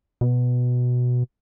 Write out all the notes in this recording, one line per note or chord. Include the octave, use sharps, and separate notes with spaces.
B2